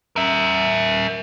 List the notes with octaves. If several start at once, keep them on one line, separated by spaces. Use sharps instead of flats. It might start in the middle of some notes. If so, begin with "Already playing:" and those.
A#4 E5